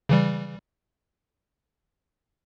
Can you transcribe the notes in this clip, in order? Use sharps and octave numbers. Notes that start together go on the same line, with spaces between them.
C#3 E3 G3